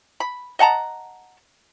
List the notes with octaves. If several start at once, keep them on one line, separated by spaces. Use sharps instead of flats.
B5
D#5 F#5 A5 A#5